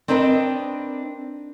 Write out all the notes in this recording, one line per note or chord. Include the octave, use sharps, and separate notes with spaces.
C4 D4 D#4 A#4 B4 D#5